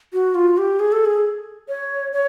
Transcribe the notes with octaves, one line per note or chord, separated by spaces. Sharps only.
F#4
F4
G4
G#4
A4
G#4
C#5
C#5